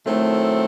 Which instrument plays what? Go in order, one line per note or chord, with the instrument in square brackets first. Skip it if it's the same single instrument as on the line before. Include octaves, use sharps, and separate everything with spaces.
[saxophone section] D#3 F#3 C4 E4 A4 [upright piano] A3